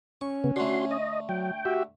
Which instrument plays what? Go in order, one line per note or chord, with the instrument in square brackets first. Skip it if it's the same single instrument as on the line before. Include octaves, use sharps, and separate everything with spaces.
[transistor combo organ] C#4 [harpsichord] C#6
[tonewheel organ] C#3 B3
[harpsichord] D3 A3 [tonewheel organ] F#4 C6
[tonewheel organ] D#5
[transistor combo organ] F#3 [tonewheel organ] G5
[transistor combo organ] F#4 G4 E5